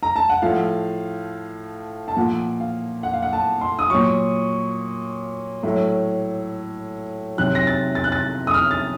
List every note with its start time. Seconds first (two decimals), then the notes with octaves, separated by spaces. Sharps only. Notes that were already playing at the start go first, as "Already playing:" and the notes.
0.03 A#5
0.16 A5
0.29 F#5
0.42 A2 F3 F5
2.08 A5
2.17 A#2 F3 F#5
2.60 F5
3.03 F#5
3.13 F5
3.23 F#5
3.33 A5
3.61 C6
3.79 D#6
3.90 A#2 F#3 C#6
5.63 A2 F#3
7.37 C3 D#3 F#3 F#6
7.55 A#6
7.67 A6
7.95 A6
8.04 F#6
8.12 A6
8.47 D#6
8.54 F6
8.71 A6